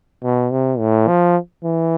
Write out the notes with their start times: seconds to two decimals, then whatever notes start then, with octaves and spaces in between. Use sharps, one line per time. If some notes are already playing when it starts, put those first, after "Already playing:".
0.23 B2
0.51 C3
0.79 A2
1.07 F3
1.64 E3